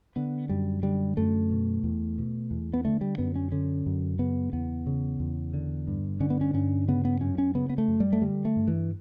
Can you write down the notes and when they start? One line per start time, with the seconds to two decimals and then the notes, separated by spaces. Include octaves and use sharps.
0.16 D3 B3
0.49 F#2 G3
0.83 D3 G3
1.17 F#2 A3
1.50 B2
1.84 E2
2.18 B2
2.51 E2
2.73 B3
2.85 D3 A3
3.01 G3
3.18 F#2 B3
3.36 C#4
3.52 D3 C#4
3.86 F#2
4.19 C#3 B3
4.53 E2 B3
4.87 C#3
5.20 E2
5.54 D3
5.88 G2
6.20 D3 C#4
6.30 B3
6.41 C#4
6.54 G2 C#4
6.88 C#3 B3
7.05 B3
7.21 F#2 C#4
7.38 C#4
7.55 C#3 B3
7.70 B3
7.78 A3
7.88 F#2
8.00 G3
8.13 A3
8.22 D3 G3
8.45 A3
8.56 G2
8.68 E3